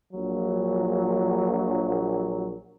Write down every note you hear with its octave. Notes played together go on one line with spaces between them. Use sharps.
A#1 F#3